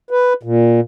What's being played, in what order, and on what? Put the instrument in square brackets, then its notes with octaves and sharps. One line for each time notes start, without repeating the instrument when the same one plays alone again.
[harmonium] B4
A#2